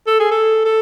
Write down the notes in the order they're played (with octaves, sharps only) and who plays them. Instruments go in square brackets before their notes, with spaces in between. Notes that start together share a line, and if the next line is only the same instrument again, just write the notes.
[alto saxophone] A4
G#4
A4
A4